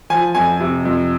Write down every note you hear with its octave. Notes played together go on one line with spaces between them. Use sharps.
F3 G#5
F2 G#5
C3
F2